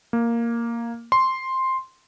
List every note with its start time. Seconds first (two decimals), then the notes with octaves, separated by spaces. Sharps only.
0.13 A#3
1.12 C6